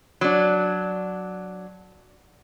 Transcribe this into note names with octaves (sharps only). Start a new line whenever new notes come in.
F#3 D4